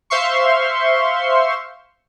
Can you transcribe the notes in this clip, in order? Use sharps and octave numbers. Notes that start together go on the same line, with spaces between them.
C5 E5 F5 C6 C#6